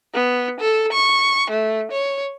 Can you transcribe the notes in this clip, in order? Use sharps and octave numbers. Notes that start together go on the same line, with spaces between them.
B3
A4
C#6
A3
C#5